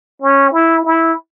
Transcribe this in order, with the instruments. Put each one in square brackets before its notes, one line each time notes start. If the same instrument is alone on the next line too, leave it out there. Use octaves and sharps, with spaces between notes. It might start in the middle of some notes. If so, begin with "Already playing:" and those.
[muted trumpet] C#4
E4
E4